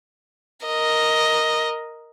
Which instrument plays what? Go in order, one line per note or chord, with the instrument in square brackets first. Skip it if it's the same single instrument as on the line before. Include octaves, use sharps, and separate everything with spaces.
[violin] A#4 D#5